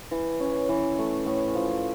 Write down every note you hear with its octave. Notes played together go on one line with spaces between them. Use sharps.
E3
C#4
E3
A3
A2
F3